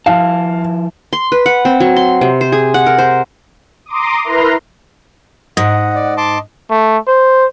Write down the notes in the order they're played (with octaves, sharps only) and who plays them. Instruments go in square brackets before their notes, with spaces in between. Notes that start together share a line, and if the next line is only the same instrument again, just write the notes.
[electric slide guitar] F3 E4 A5 [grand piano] F5
[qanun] C6
B4
F#5
C4
F#3
C6
C3
C5
G#4
F#5
A#4
C5
[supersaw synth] A#5 C6 D6 D#6
E4 A#4 B4 A#5 C6
[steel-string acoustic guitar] G#2 [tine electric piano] D#5 [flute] F#5
[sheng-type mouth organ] D5
A5 C6 D6
[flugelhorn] A3
C5